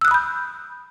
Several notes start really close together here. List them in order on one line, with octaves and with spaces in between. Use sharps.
E6 F#6 D#6 B5 G6